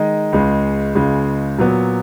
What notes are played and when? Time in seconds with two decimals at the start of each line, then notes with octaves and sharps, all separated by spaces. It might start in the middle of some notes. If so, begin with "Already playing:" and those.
Already playing: D#3 G#3 D#4
0.33 C#2 C#3 G#3
0.95 C#2 C#3 G#3
1.58 A#2 F#3 B3